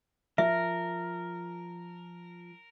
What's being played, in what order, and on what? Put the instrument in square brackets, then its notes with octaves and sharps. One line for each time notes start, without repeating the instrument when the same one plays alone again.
[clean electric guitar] F3 [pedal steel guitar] A#4 [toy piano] E5